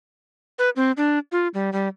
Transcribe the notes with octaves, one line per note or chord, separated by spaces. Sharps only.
B4
C4
D4
F4
G3
G3